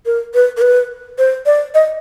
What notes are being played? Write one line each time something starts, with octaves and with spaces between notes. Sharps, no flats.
A#4
B4
A#4
B4
C5
D5
D#5